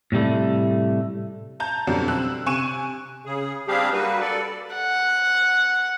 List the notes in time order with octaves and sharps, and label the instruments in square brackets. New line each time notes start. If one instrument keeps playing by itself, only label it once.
[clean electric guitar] A2 C3 G3 A3
[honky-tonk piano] A5 A#5 G6
F2 B2 D3 F#3 G3 B3
C4 E6 F#6
C3 G#5 C#6 F#6 D7 E7
[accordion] C#3 G#4
G3 C4 D4 G4 G#4 F5
G3 A#3 F#4 B4
A4 D5
[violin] F#5